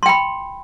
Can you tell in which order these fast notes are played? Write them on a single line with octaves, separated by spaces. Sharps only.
C6 G5 B5